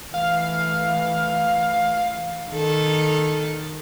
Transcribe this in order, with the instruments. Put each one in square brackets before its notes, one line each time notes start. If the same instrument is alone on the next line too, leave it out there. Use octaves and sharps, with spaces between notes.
[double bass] E3 A3 [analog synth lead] F5
[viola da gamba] D#3 A4